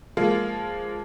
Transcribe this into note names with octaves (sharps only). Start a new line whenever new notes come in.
F3 G#3 A#3 F4